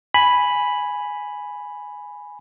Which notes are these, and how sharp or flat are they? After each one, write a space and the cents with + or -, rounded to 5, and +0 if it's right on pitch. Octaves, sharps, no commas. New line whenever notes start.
G#5 +0 B5 +0